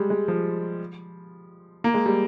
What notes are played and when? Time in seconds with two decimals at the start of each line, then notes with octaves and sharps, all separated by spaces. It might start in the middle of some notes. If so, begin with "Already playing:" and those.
Already playing: G3 G#3
0.10 G#3
0.28 F3
1.84 A#3
1.94 G#3
2.06 G3